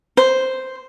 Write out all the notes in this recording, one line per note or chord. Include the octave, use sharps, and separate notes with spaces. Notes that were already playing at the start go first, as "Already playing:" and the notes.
C5